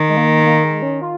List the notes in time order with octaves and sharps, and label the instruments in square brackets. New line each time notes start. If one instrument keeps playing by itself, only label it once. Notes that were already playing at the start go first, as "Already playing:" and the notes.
Already playing: [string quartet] D#3
[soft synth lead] G#3
A#3
A#3
G#3
C#4
F4